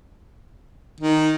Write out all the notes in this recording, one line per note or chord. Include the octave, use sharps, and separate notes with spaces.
D#3